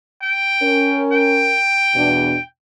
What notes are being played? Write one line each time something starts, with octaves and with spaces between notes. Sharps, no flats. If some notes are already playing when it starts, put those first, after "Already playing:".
G5
C#4 A#4
G5
E2 B2 D4